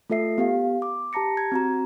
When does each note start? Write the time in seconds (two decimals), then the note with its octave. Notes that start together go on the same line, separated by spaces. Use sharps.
0.10 A3 F4 A4 E5 C7
0.38 B3 G4 F5
0.82 D6
1.13 G4 A5 A#5 A#6 C#7
1.37 G#6
1.52 C4 F#4 A#5